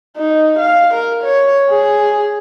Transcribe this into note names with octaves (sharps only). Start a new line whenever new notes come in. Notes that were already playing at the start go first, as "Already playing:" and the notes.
D#4
F5
A#4
C#5
G#4